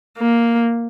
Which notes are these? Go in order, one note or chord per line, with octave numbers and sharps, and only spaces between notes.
A#3